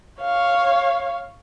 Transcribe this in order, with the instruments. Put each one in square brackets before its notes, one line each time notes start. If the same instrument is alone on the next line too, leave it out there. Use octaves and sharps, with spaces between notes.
[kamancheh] C#5 F5